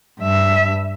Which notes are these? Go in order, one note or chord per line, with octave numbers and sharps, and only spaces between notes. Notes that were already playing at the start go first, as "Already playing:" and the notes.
G2 E5